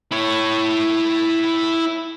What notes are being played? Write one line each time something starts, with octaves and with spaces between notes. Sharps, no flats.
E4 C#5